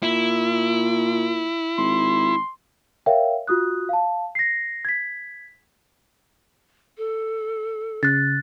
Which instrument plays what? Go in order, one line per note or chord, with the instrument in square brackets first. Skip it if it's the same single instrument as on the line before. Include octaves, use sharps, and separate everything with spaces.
[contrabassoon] A#2 [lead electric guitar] E4
[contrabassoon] G#1 [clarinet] C6
[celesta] A#4 C#5 E5 F5 G5
F4 F#4 D#6 F#6
F5 A5
A#6 C7
G#6 B6
[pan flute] A4
[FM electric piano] C#3 [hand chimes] F#6 A6